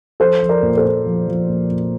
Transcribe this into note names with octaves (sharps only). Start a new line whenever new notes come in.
F3 A4 C5
F3
A#4 D5
A#2
A4 C5
A#2
F3
F3
A#2
A#2